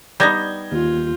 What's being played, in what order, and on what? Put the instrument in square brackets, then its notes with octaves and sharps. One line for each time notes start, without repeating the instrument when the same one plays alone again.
[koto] G3 B3 D#4 [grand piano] G6 G#6 A#6
[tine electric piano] D#2 [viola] F4